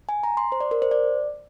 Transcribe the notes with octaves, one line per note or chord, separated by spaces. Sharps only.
G#5
A#5
C6
C5
D5
A#4
C5
D5